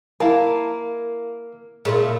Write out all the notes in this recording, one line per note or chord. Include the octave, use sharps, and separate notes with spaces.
A#3 E4 A#4 F5 A5
A#2 C#3 A3 E4